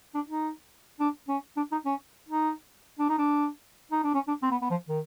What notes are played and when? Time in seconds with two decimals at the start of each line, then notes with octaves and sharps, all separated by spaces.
0.15 D4
0.28 D#4
1.00 D4
1.28 C#4
1.57 D4
1.72 D#4
1.86 C#4
2.29 D#4
2.99 D4
3.09 D#4
3.18 D4
3.92 D#4
4.04 D4
4.14 C#4
4.28 D4
4.42 C4
4.51 B3
4.62 B3
4.70 F3
4.89 D#3